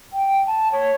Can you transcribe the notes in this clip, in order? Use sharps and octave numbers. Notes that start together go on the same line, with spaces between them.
G5
A5
C#5